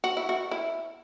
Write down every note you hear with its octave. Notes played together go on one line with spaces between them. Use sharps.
F#4
E4
F#4
E4